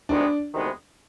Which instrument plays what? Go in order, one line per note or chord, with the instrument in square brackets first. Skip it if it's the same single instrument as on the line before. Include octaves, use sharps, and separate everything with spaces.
[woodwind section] D2 C3 D#3 G#3 B3 [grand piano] D4
[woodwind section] D2 C3 D#3 G#3 B3